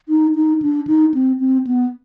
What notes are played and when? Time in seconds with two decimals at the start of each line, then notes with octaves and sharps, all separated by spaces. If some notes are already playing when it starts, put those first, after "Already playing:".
0.09 D#4
0.35 D#4
0.62 D4
0.87 D#4
1.14 C4
1.40 C4
1.67 B3